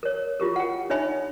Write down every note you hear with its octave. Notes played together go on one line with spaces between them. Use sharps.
A#4 C#5
E4 F4 G4 A#4
F#5 G5
D4 D#4 C#5 E5 G#5 B5